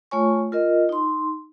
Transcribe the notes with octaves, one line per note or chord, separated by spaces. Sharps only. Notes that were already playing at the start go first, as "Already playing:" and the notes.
A3 F4 C#5 G#5 C#6
F4 A#4 D#5
D#4 C6